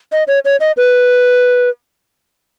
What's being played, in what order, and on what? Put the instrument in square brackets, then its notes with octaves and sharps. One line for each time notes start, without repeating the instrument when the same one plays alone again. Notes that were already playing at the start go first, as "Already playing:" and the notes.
[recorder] D#5
C#5
C#5
D#5
B4